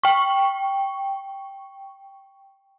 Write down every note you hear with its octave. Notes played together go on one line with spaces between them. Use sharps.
G5 C#6